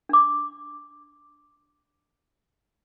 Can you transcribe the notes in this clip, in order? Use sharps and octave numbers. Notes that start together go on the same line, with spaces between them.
D4 D6